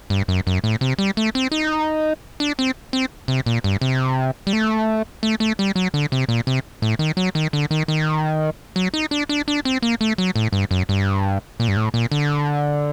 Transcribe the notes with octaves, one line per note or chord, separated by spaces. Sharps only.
G2
F#2
F#2
A2
C3
G3
A3
C4
D#4
D4
C4
C4
C3
A#2
G2
C3
G3
A3
A3
A3
G3
F#3
D3
C3
A#2
C3
A2
D#3
F#3
D#3
D3
D#3
D#3
F#3
D#4
D4
D4
D4
C4
A#3
A3
F#3
A2
G2
F#2
G2
A#2
G2
A2
A#2
D3